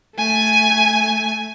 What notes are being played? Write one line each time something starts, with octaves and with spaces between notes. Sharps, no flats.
A3 G#5